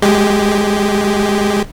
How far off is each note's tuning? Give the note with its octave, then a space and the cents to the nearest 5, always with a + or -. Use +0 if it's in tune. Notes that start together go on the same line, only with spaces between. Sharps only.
G#3 +0 G4 +0